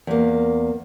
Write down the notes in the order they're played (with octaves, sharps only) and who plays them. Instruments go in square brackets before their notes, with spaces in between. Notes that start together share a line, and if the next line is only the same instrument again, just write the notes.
[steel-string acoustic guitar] E2 A#3